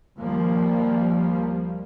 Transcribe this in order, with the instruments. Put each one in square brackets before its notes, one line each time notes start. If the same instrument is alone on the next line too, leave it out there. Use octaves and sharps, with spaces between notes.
[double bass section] D#2 F3 G3 A#3